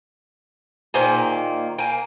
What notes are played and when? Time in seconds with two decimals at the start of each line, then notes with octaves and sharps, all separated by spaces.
0.94 A#2 D#3 A#3 G#4 C5
1.78 A#3 G5 G#5